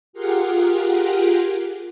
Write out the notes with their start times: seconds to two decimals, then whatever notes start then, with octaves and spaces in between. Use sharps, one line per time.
0.13 F4 G4 G#4 A#4 F5 F#5